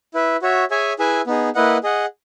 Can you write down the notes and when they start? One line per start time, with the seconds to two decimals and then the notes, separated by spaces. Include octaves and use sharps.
0.14 E4 B4 E5
0.42 F#4 C#5 E5
0.70 G#4 C#5 E5 G#5
0.99 E4 G#4 B4 E5 G#5
1.27 B3 D#4 G#4
1.55 A#3 E4 B4 D#5 F#5
1.83 G#4 D#5 F#5